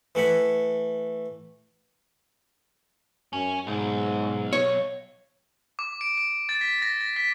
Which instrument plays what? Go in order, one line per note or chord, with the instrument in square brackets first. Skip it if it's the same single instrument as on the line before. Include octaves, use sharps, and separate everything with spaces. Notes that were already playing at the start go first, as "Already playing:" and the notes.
[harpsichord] E3 A3 F#5 B5
[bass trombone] F#2 [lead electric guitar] C#4
[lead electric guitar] B1 [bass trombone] G#2
[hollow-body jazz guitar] C#5
[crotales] D6
D7
D7
A6
B6
A#6
A#6
B6